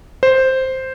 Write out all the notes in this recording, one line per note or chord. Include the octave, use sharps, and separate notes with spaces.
C5